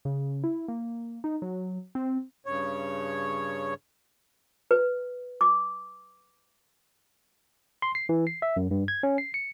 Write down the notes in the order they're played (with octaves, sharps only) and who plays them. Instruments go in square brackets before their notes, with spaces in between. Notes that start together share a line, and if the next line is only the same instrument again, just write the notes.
[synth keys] C#3
E4
A#3
D#4
F#3
C4
[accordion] G2 C#3 C#5
[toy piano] B4
D6
[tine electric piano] C6
C7
E3
C7
E5
F#2
G2
G#6
C#4
C7
C#7